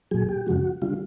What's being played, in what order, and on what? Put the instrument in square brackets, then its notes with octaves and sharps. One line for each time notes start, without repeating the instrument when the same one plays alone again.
[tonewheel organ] A#2 F#3 G#4
G4
F#2 C#3 F3 G#3 F#4
D3 G3 F4